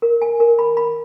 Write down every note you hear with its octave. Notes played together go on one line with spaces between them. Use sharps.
A#4
G#5
A#4
B5
B5